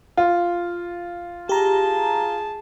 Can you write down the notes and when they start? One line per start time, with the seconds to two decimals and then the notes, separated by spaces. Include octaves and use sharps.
0.17 F4
1.49 G4 G#4 A5 A#5